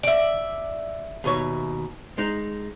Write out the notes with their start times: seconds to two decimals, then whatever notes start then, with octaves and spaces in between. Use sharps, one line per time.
0.03 D5 E5
1.24 D#2 B2 C#5
2.18 G#3 D#4